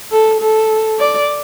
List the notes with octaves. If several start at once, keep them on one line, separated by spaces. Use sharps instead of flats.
A4
A4
D5